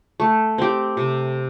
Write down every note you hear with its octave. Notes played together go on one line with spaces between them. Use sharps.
A3
C4 G4
C3